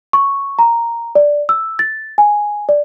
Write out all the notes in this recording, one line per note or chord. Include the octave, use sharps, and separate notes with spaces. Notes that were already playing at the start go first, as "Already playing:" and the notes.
C#6
A#5
D5
E6
A6
G#5
D5